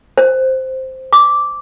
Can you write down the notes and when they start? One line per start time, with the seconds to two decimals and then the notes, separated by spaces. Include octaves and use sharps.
0.18 C5
1.13 D6